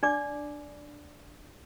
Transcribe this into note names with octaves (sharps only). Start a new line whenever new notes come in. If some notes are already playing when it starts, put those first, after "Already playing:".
D4 D5 D6